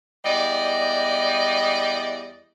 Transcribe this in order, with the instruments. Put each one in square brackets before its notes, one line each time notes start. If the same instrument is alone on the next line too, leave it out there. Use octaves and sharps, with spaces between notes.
[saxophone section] E2 G3 D5 D#5